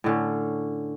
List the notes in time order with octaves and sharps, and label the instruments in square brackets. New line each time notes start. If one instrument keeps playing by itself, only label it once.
[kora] A2 D3 C#4